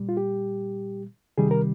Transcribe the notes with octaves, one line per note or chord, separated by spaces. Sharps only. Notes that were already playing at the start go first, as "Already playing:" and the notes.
Already playing: A#2 G3
F4
G4
C3 D#3 G3 G#4
A#4